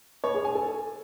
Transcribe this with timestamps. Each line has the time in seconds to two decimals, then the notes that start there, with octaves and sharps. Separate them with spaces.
0.24 C#5
0.34 G#4
0.45 G#5
0.55 A4